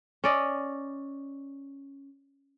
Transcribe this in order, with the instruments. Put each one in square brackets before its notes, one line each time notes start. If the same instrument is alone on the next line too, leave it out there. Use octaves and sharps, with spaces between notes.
[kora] C#4 D5 D#5